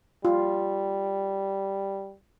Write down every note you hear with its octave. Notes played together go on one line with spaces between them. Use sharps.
G3 F4